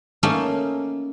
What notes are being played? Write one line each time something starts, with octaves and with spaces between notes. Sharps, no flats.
A3 A#3 C#4 D#4